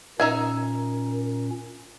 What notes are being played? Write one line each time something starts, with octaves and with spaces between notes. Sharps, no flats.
A#2 C#4 D#4 A#4 E5 G#5